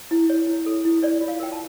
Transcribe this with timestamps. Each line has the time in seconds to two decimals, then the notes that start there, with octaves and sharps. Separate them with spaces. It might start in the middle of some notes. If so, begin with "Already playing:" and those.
0.11 E4
0.30 C#5
0.47 E4
0.66 A4
0.85 E4
1.03 C#5 D5
1.21 F4
1.28 F5
1.40 A#4 G5
1.52 A5